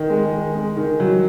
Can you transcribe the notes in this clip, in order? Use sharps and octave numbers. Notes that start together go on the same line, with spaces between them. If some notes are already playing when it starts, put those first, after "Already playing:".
Already playing: D#3
G#3
D#3
G#3
D#3
F#3